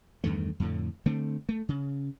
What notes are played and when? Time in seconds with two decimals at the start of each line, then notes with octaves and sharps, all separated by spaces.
0.24 E2 G2 D#3 A3
0.60 F2 A2 D3
1.06 D3 A3 C4
1.49 A3
1.69 C#3